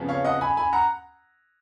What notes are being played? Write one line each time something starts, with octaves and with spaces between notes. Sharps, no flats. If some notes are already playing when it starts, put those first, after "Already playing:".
Already playing: F2 C#3 F3 B3
C#5 F5
D#5 F#5
G#5 B5
G#5 B5
F#5 A#5